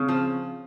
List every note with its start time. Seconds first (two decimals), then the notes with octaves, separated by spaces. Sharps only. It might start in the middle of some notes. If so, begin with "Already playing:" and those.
Already playing: C#3 C4
0.08 F3